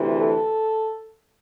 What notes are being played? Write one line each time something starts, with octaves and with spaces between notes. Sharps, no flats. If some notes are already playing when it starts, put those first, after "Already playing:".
Already playing: D2 C3 E3
A4